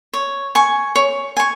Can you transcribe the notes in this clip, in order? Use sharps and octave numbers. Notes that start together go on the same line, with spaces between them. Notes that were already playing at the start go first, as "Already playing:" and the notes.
C#5
G#5 C#6
C#5
G#5 C#6